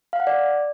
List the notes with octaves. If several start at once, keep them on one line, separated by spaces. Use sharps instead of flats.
F5
F#5
D5